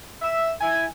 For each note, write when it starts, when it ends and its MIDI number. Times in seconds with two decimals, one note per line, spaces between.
0.22 0.51 76
0.61 0.85 64
0.61 0.85 80